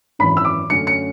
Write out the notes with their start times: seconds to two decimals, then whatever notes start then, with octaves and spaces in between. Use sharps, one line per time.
0.19 G#1 F#2 E3 B5
0.37 E6
0.45 D6
0.70 F#2 D3 A3 C#4 C#7
0.87 C#7